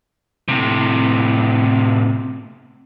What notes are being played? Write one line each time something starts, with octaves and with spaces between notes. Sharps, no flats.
A2 C3